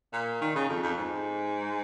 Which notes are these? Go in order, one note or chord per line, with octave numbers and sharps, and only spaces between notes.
A#2
D#3
C#3
F2
F2
G#2